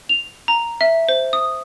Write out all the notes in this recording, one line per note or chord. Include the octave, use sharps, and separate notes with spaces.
F7
A#5
E5
C5
D#6